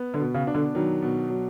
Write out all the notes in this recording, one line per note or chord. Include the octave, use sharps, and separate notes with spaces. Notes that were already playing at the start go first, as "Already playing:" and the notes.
Already playing: B3
D3
B2
C#3
D4
D3
D#3 F#3
B2
F#3